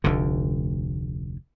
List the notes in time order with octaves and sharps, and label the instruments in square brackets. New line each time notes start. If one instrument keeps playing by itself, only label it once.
[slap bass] F1 D2 D3